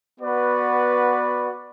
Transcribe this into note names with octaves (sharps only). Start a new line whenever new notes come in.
B3 F#4 B4 D5